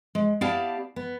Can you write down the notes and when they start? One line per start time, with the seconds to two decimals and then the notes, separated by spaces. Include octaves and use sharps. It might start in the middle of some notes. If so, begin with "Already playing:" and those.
0.15 G#3
0.41 B3 E4 G4 D5 F5 A5
0.96 B3